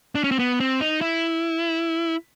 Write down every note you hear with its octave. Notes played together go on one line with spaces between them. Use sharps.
D4
C#4
C4
B3
C4
D#4
E4